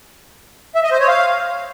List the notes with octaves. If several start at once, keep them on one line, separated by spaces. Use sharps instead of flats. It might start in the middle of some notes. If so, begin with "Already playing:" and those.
E5
D#5
C5
C#5
F5